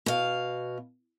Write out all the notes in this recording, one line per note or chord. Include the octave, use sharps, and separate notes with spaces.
B2 F5